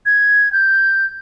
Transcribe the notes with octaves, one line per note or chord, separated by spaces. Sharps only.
G#6
G6